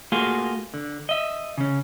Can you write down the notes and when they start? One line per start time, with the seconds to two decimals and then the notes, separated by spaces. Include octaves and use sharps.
0.12 A3 A#3 F4 F#4 G#4
0.74 D3
1.09 D#5 E5
1.58 C#3 C#4